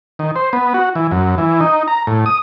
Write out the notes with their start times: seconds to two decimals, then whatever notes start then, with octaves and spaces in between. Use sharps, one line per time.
0.19 D#3
0.36 C5
0.53 B3
0.74 F#4
0.95 E3
1.11 F#2
1.38 E3
1.61 D#4
1.88 A#5
2.07 A2
2.26 D#6